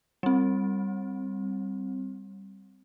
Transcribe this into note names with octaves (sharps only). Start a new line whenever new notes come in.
G3 C4